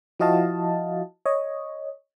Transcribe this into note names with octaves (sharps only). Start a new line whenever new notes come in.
F3 E4 F#4 D#5 F5 A5
C#5 D#5